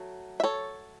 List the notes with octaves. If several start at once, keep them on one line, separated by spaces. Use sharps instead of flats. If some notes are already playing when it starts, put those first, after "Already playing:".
Already playing: F#3 A3
E5
A4 C#5